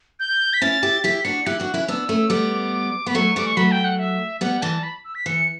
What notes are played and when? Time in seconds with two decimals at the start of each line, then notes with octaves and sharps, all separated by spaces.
0.20 G6
0.53 B6
0.62 C#4 E4 A6
0.83 E4 G4
1.04 E4 G4 B6
1.18 B6
1.25 D4 F#4 C#7
1.46 E4 G4 F#6
1.59 D4 F#4
1.74 C#4 E4
1.88 B3 D4 E6
2.09 A3 C#4
2.30 G3 B3 D6
3.06 B3 B5
3.15 F#3 A3 C#6
3.36 E3 G3 D6
3.47 C#6
3.57 F#3 A3 B5
3.72 G5
3.85 F#5
3.99 E5
4.41 G3 B3 F#5
4.62 E3 G3 A5
4.83 B5
5.05 E6
5.15 B6
5.26 E3 C#7